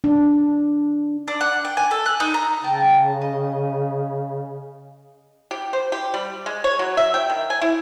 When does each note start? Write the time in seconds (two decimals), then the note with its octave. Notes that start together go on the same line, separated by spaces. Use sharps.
0.04 D4
1.28 D4
1.41 F#5
1.65 G5
1.77 G#5
1.91 A4
2.06 F#6
2.20 D#4
2.34 A#5
2.64 C#3 G5 A5 A#5
3.22 D#5
5.51 G4
5.73 C5
5.92 G4
6.14 G3
6.46 G#3
6.64 C#5
6.79 F#3
6.97 E5
7.14 G5
7.30 D#3
7.50 G#5
7.61 E4